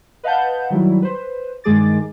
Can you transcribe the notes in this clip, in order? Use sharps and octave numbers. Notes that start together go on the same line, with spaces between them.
B4 D#5 F5 F#5 A5 G6
D#3 F#3 G3 E4
B4 C5
G2 D#3 G#3 G#4 D6 A6